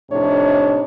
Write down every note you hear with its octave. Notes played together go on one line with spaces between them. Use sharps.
F2 A2 C3 D4 D#4 C#5